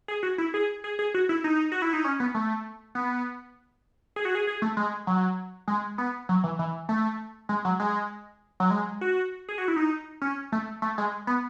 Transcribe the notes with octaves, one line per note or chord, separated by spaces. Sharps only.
G#4
F#4
E4
G#4
G#4
G#4
F#4
E4
D#4
F#4
E4
D#4
C#4
B3
A3
B3
G#4
F#4
G#4
G#4
A3
G#3
F#3
G#3
B3
F#3
E3
E3
A3
G#3
F#3
G#3
F#3
G#3
F#4
G#4
F#4
E4
D#4
C#4
A3
A3
G#3
B3